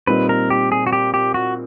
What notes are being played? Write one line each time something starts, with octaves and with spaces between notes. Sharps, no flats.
A#2 G3 C4 D#4 B4
A#4
G4
G#4
F#4
G4
G4
F#4